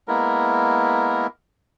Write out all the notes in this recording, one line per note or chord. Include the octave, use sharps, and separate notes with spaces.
G#3 A#3 B3 E4 A#4